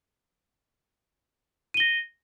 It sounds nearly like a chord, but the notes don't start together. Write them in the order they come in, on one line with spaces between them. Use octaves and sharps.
D#7 G7 A#6